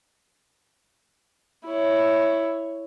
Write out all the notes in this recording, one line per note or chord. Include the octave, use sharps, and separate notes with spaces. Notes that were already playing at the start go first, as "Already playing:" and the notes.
E4 C#5